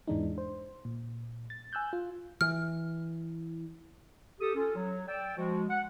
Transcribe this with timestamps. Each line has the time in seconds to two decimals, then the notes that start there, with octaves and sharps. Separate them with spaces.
0.08 E2 G#2 E3 G#3 D4 D#4
0.38 C5
0.85 A#2
1.50 A6
1.73 G#5 E6 F#6 G6
1.93 F4
2.41 E3 F6
4.41 G4 A4 D#6
4.55 C#4 F4 A4
4.76 F#3
5.08 D5 G5 E6
5.37 F3 G#3 F#4
5.70 F#5